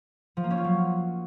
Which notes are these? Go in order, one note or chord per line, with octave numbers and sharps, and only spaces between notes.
F3
A#3
C#4
F4
F#3